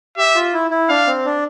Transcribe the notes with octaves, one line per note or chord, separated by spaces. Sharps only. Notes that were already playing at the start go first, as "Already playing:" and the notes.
G4 E5
F4
E4
E4
D4 F5
C4
D4